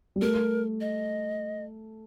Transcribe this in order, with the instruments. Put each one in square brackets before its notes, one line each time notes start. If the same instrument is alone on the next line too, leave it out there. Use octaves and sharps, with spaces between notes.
[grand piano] G3
[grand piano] A3 [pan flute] A#4
[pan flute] D#5